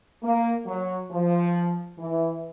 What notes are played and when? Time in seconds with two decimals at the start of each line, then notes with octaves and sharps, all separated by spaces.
0.22 A#3
0.66 F#3
1.11 F3
1.98 E3